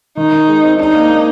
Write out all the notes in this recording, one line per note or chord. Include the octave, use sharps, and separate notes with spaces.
D#3 D#4
D#3
G#3
C4
D4 D#4
A#3
A#3